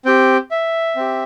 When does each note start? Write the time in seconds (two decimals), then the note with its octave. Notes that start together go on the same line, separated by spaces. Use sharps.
0.05 C4 G4 G5
0.51 E5
0.96 C4 G4